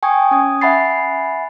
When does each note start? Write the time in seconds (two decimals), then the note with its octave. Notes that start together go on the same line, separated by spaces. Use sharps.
0.03 G5 G#5 C#6 D#6 G#6
0.31 C#4 D#6 G#6
0.61 E5 F#5 G#5 B5 A6 C7